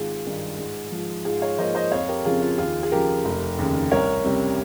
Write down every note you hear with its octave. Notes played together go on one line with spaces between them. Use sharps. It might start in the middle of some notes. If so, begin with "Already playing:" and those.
Already playing: G#1 F4 G#4
G2 D#3 G#3
G#2
F3 G#3
G#2 F4 G#4
C#5 F5
F3 A#3 D#4 C5 D#5
C5 D#5
F2 C#5 F5
G4 A#4
C#3 F3 C4 F4 G#4
F4
D#2 F4 G#4
G#4
C#3 F3 G4 A#4
F1
D#2 C#3
C2 A#4 C#5
C3 G3 C#4